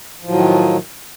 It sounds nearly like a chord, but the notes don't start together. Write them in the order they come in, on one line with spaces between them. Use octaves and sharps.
F3 A2 F#3 D#3